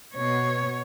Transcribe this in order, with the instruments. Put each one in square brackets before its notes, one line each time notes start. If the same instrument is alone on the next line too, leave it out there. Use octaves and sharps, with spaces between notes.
[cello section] B2 B3 [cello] C#5